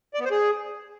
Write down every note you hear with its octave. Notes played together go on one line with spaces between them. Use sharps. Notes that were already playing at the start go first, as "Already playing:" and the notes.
D5
B3
C5
G#4